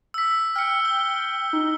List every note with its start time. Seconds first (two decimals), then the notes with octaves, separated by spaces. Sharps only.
0.14 E6 B6
0.56 G5 F6 C#7
0.85 G7
1.53 D#4